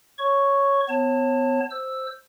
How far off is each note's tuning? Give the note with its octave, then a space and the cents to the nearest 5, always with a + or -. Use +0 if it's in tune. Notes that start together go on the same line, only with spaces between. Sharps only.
C#5 +0 C#6 +0
B3 +30 C#5 -25 A5 +15
C5 +0 E6 +0